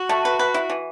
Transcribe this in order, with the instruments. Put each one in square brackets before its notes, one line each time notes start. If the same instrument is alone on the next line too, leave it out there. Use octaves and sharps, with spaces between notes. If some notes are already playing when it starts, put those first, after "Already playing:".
Already playing: [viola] F#4
[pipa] A3
B4
B4
E4
E3